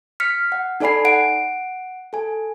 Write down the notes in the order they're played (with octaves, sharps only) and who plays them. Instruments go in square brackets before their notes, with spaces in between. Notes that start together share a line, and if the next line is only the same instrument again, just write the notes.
[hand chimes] F6 B6 C#7
F#5
D#4 A4 D5 G#5 B5 C7
F#5 D7
A4 G#5